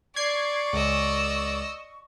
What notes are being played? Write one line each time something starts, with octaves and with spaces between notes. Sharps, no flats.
D5 C#6 G#6 C7
C#2 D#5 E6